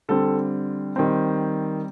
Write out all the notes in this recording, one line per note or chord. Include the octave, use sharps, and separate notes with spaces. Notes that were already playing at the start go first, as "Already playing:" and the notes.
D3 G3 C4 A4
D#3 G3 C4